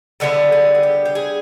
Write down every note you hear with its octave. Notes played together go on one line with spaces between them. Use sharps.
D3 G3 B3 E4 A4
G#4
G#4
G4
G4
G#4